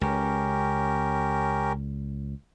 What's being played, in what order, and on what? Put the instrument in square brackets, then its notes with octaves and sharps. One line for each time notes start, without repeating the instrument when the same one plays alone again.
[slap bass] C#2 [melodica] C#4 G4 A#4